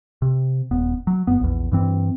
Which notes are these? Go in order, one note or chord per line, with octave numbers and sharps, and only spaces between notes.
C3
D#1 B3
F#3
F#1 F#2 B3
A#1 E2
G2 E3 C4